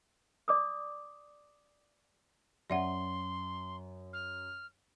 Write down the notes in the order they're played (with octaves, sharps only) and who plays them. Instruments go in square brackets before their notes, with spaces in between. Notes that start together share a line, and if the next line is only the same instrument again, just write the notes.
[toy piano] D5 D6 D#6
[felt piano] F#2 [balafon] D5 E5 F#5 [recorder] C6
[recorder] F6